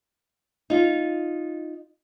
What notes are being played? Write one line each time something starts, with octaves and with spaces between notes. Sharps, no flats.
D#4 F4